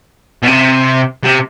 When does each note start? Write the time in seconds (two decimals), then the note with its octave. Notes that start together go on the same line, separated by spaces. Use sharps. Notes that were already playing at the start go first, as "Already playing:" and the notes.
0.43 B2
0.47 C3
1.24 C3